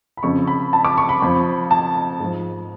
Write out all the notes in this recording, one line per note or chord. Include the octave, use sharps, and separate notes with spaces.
B5
F2 C#3 F3 C#6
B5
A5
D6
C#6
B5
F2 F3
A5
G#2 F3